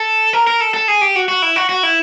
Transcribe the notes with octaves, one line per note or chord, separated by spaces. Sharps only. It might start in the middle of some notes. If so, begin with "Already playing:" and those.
Already playing: A4
A#4
A#4
A4
A4
G#4
G4
F#4
F#4
E4
F#4
F#4
E4